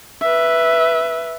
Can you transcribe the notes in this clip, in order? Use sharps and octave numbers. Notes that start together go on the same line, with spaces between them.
B4 E5